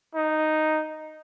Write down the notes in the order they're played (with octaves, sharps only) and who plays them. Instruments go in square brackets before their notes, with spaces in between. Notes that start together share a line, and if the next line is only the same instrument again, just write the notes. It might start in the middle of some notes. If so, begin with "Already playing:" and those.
[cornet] D#4